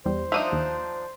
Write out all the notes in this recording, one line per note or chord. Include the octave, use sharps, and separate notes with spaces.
E2 G3 C5
F3 D4 D#4 E5 D#6
D#2